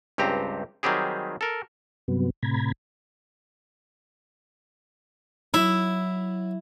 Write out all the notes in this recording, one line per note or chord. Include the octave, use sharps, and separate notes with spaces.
C#2 G2 C4 G4 A#5
D#3 F#3 G3 C4 G4 G#4
A4 A#4
G2 C3 F#3 B3
A2 C3 A#5 B5 G#6
F#3 E4 E5